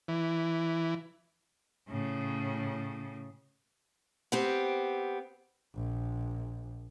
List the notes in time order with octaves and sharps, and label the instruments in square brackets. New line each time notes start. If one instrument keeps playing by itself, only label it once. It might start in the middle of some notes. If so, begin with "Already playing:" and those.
[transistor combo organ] E3
[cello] A2 C#3
[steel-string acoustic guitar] B3 C4 G4
[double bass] A#1